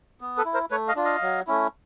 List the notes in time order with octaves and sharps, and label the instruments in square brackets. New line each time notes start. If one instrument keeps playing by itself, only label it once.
[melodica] B3
A4 B4
E4
A#4 C5
A3 B4 C#5
D#5 F5
D4 F4
D#5 F5
F#3
A3 C#4 E4